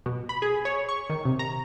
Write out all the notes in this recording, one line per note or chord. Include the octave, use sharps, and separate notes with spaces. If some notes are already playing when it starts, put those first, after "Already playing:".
B2
B5
G#4
C#5
C#6
D#3
C3
A#5